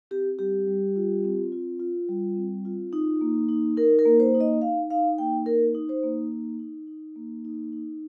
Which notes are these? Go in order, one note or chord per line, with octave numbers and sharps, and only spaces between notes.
C4 G4
G3 G4
G3
F4
C4
F4
F4
G3
C4
F4
D#4
A#3
D#4
D#4 A#4
A#4
A#3
C5
D#4
D#5
D#4 F5
D#4 F5
A#3 G5
D#4 A#4
D#4
C5
A#3
D#4
D#4
D#4
A#3
D#4
D#4